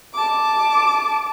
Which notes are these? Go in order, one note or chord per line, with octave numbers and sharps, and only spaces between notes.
A5 D6